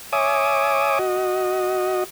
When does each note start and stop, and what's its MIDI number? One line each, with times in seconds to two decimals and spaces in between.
0.13 0.99 73
0.13 0.99 76
0.13 0.99 80
0.13 0.99 86
0.13 0.99 87
0.99 2.04 66
0.99 2.04 75